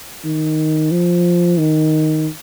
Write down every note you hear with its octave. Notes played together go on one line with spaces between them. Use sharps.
D#3
F3
D#3